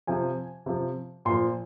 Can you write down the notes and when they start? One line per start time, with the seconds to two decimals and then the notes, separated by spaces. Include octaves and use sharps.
0.07 C3 F3 G#5
0.66 C3 F3
1.25 A#2 C6
1.30 F3